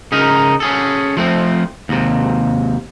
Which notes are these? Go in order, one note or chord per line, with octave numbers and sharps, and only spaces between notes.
C#3 C#4 D#4 A#4
C#4 G#4 A4
F3 A3 C4
D#2 C3